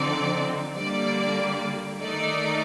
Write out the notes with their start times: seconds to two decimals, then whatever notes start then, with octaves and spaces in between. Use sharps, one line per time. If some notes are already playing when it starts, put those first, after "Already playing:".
Already playing: D3 F3 C4 D#4 D5
0.77 D3 G3 A#3 D5
2.00 D#3 A3 D#4 D5